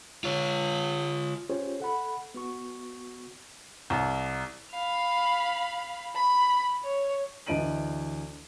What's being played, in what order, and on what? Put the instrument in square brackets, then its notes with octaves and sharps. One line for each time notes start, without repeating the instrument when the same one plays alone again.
[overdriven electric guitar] F4 C#5
[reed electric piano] C#4 F4 G4 G#4 C5 C#5
A4 F#5 B5
B3 F#4 C#6
[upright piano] C2
[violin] F5 B5
B5
C#5
[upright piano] D2 E3 D#5 D7 D#7 F#7